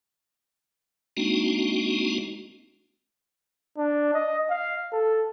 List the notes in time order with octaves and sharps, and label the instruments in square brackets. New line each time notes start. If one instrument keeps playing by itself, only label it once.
[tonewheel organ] G#3 A#3 C4 D4 D#4 F#4
[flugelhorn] D4
D#5
F5
A4